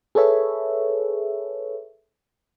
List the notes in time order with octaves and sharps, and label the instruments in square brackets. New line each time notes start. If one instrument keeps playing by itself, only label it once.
[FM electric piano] G#4 A4 B4 C#5 E5